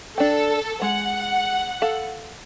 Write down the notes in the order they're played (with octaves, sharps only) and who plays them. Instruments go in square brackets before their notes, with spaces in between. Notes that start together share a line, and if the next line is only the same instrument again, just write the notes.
[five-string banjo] D4 G5 [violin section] A4
[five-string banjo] G#3 [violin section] F#5
[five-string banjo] A4 F5